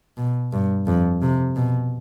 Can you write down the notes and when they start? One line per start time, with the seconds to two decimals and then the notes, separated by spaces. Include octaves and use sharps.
0.17 B2
0.53 G2
0.87 F2
1.22 C3
1.56 B2